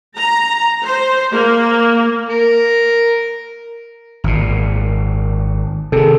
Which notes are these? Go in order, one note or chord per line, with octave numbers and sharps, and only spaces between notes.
A#5
C5
A#3
A#4
G#1 A#2
C3 D#3 G#4 A4